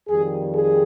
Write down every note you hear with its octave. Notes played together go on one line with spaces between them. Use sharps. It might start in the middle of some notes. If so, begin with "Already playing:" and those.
F2 D#3 G3 G#4
G#4